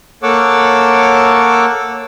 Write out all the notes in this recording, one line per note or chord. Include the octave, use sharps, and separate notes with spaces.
A#3 A4 C#5 F#5 D6 E6